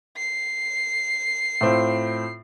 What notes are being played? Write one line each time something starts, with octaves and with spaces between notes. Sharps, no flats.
C7
A2 C4 F4